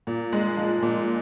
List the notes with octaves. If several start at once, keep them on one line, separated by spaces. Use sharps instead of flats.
A#2
G#3
F3
A#2